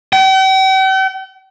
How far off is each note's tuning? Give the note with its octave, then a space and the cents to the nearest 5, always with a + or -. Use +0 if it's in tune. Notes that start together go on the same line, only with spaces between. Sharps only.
G5 -45